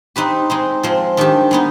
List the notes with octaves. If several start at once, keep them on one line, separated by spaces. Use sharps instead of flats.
C4 D#4 G4 B4
G#3 C4 D#4
F3 G#3 C4
D#3 G3 D4 G4
G#3 B3 D#4